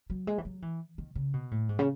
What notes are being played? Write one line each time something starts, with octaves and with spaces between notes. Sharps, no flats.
F#3
G#3
E3
F#3
E3
D#3
C#3
B2
A2
G#2
C#3